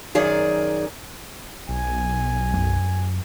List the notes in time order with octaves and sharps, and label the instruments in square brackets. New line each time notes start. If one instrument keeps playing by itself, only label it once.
[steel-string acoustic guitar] F#2 D#3 G#4 D5
[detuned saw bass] B1 [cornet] G#5
[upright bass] F#2